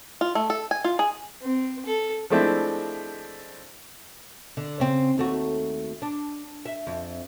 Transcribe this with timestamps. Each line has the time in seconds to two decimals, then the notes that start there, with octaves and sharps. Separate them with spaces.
0.21 F4
0.35 A3
0.50 A4
0.71 G#5
0.84 F4
0.99 G#4
1.42 C4
1.86 A4
2.30 F3 G#3 A3 C4 D4 E4
4.57 D3
4.80 C#3 C4
5.18 D#2 A3 F#4
6.02 D4
6.66 E5
6.87 F2